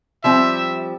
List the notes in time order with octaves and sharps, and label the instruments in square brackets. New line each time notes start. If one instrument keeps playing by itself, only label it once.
[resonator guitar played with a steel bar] F3 G3 C4 [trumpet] E5